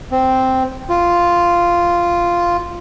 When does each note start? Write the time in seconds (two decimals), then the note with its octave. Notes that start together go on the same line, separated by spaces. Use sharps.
0.12 C4
0.89 F4